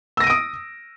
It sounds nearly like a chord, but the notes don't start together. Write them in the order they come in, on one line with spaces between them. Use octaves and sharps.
E6 A#6 D#7 D7 D#6